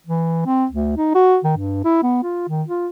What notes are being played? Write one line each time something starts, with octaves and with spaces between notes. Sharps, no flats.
E3
C4
D2
D#4
F#4
D#3
G2
E4
B3
F4
D#3
F4